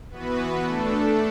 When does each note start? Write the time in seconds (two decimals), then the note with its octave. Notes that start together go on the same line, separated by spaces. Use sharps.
0.11 E3 B3 F#4 B4
0.63 A3 D4 A4